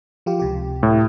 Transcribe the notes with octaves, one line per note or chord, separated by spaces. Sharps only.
F3 F4 G4
C#2 C3 G4
A2